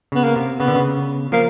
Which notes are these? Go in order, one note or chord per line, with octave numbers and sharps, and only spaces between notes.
C#3 B3
A#3
C3
C#3 B3
D3
C#3
F3 A#3